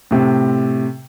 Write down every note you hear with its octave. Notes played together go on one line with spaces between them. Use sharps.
A2 C3 C4